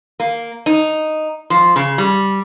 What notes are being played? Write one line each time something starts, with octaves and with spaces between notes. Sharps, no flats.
A#3
D#4
F3
C#3
G3